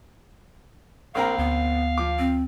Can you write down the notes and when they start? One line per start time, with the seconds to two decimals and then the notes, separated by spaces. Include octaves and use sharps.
1.15 A#1 C4 A#4 F5 A#5
1.38 D2 B3
1.98 F3 D6
2.19 C4